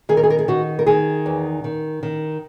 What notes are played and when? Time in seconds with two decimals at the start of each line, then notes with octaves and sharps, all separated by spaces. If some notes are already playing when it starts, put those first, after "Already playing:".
0.09 D#3 G#4
0.17 A#4
0.23 G#4
0.30 A#4
0.39 G#4
0.48 D#3 F#4
0.79 A#4
0.87 D#3 G#4
1.26 E2
1.64 D#3
2.03 D#3